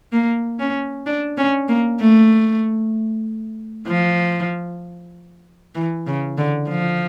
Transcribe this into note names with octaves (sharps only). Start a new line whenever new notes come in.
A#3
C#4
D4
C#4
A#3
A3
F3
E3
C#3
D3
F3